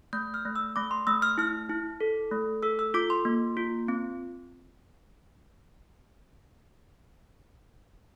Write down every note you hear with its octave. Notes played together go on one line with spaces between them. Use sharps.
A3 G6
F6
A3
E6
A3 D6
C6
A3 E6
F6
E4 F6
E4
A4
A3
A4 E6
E6
F4 D6
C6
A#3
F4
C4